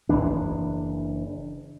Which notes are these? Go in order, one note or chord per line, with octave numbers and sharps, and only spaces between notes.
F#1 D#2 E3 D4